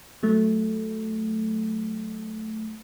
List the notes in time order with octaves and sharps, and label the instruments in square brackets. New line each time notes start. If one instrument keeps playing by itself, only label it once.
[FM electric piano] F#3 A3